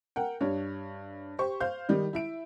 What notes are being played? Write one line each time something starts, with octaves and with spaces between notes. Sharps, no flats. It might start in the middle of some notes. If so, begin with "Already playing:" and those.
A#4 F#5 G5
G2 C#5
G4 C5 C#6
C5 F5 G6
D#3 G3 D#4
E4 E5 D7